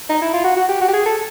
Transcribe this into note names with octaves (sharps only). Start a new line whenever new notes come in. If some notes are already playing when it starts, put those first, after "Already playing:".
D#4
E4
F4
F#4
F#4
G4
F#4
G4
G#4
A4